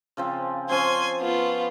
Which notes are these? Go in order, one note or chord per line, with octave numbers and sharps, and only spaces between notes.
C#3 F3 C4
F3 C4 C#4 G#5 C6
B3 F4